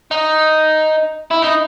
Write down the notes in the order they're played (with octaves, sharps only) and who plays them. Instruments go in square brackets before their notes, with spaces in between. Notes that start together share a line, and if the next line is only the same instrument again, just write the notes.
[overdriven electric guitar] D#4
E4
D#4